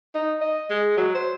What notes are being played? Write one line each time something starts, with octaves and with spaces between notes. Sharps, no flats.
D#4
D#5
G#3
F#3
C5